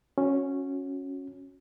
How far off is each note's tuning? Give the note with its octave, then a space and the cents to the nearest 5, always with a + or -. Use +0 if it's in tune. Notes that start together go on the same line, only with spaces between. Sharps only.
C#4 -5 F#4 -20